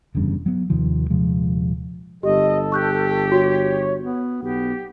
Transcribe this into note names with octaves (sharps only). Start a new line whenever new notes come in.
F1 E2 G2 C#3
F#3 B3
D#2 C3 D#3 F3
D#1 C3 F3 G#3
G1 G4 A4 D#5
G4 C#6 F#6 G6
F#4 C#5
B3
B1 B3 G4